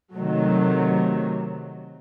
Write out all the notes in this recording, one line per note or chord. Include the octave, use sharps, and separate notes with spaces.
C3 D#3 F#3 A3